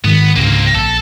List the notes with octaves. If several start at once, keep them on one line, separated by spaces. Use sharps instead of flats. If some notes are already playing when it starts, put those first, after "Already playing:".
G#2 D#3 B3
C#2 G#2 D3 A#3 C4
A#1 A4